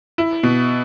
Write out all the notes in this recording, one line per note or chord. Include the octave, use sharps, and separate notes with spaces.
E4
B2